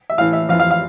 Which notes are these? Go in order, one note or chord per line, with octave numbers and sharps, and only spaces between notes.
E5
A2 E3 F5
E5
F2 E3 F5
F5
F5